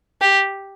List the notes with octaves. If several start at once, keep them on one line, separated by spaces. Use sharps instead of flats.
G4